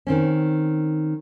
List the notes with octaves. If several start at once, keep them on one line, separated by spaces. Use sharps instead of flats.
D#3 C4 C#4